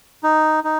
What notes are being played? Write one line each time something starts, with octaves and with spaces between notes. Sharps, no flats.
D#4
D#4